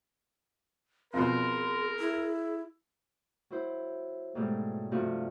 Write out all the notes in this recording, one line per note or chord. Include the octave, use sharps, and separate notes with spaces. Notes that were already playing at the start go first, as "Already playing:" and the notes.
F2 B2 G#4 A#4 C6
E4
F#3 E4 C5
G#2 B2 F#3 G3 A3
G2 C3 F3 A3 F#4 F5